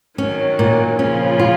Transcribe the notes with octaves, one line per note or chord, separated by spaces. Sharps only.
D#3 F#3 C#4
A#2
C#3 F3 C#4
F4